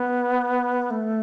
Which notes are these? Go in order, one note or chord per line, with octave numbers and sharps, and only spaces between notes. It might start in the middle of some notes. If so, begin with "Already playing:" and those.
Already playing: B3
A3